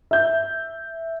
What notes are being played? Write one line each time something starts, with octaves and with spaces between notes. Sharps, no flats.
E5 G6